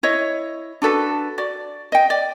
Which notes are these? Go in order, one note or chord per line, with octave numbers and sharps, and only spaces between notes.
E4 C#5 D#5
D4 F#4 A4 B4
F#4 D5
D#5 G5
D5